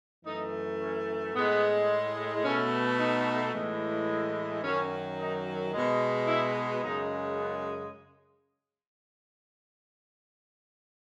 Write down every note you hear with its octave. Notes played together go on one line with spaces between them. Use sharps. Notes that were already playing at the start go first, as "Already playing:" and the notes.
F#2 E3 A3 D#4
C#4
A2 G#3 B3
B2 A3 C#4
D#4
A2 E3 G#3
F#2 D#3 F#3 C#4
D#4
B2 G#3
E4
F#2 C#3 G#3 D#4
B3